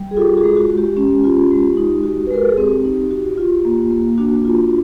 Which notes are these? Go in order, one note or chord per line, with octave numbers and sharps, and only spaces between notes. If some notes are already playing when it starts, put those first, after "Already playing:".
Already playing: G3
G#4
F4 G4 A4
F#4 G#4
G#3
F#4
G#3
G4
C#4 G4
F4
G#3
D#4
F#4
B4
G#3 A#4
A4
G#4
C4 G4
D#4
F#4
F4
A#3
A#3
D4 F#4
F#4
F4